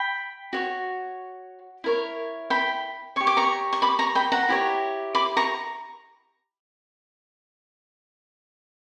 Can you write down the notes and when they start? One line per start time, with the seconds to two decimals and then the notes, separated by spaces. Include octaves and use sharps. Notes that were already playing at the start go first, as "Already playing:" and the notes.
Already playing: G5 B5
0.53 F#4 C#5
1.84 E4 A#4 C#5
2.50 G5 B5
3.16 G4 C#5 C#6
3.27 D6
3.37 A#5 C#6
3.73 C#6
3.82 B5 D6
3.99 A#5 C#6
4.15 G5 B5
4.32 F#5 A#5
4.49 E4 G4 C#5
5.15 B5 D6
5.37 A#5 C#6